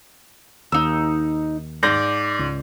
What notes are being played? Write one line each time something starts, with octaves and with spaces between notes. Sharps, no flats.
D#2 D#4 E6
G#2 D5 G6 A#6
C#2